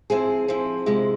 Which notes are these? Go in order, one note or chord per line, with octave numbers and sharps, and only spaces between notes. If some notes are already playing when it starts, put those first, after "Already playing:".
F3 C4 E4 G#4
F3 C4 E4
C3 F3 G#3 E4